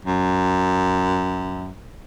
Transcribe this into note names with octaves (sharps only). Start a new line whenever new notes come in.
F#2